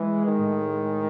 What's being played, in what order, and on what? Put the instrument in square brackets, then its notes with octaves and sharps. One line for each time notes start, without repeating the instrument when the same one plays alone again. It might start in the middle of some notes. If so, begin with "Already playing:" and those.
Already playing: [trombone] E3 [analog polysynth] G#3
[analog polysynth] G#3
[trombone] D#3
[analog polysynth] A2